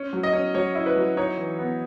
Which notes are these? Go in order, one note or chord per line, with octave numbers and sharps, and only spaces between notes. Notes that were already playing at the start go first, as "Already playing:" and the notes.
Already playing: C#4
F#3
D#5
C#4
F#3 C#5
E4
B4
F#3
D#4 C#5
E3
B3